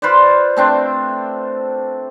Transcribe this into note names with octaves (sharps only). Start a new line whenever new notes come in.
F4 B4 C5 D5
A3 C4 D4